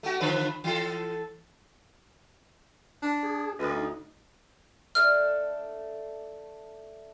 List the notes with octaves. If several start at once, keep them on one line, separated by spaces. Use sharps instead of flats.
A3 F#4
D3 F3 B4
E3 A4
D4
G#4
D2 B4 D#5
D#4
A3 D4 A4 F6